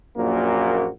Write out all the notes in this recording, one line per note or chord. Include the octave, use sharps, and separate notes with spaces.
A#1 F#2 A#2 A#3 F#4